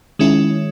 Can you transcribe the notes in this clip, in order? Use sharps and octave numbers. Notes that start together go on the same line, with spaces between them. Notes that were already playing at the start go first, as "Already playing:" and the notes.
D#3 G#3 C#4 E4